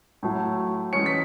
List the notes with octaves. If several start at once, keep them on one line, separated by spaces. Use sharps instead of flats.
A2 F#3 A3
E3 G#3 C#4 C#7
B6